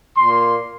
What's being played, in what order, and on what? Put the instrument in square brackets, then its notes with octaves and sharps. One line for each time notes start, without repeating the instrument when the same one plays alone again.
[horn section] A#2 A#3 C6